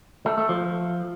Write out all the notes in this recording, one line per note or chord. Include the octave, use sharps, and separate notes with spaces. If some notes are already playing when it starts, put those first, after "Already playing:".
A3
A3
F3